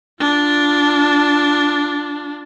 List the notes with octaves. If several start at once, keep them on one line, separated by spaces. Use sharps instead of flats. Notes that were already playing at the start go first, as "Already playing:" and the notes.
D4 F4